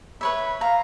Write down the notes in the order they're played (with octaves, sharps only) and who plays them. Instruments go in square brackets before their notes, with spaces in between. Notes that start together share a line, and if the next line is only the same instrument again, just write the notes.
[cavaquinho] B4 C#5 E5 [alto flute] B5
[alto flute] F5 [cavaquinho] A#5